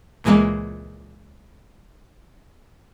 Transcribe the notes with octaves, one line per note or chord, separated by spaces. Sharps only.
C#2 A#2 E3 G#3 A#3